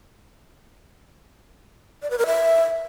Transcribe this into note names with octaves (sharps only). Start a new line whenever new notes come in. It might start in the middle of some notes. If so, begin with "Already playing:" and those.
D5
B4
A#4
E5